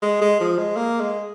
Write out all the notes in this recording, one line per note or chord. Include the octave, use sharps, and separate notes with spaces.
G#3
G#3
F3
G#3
A#3
G#3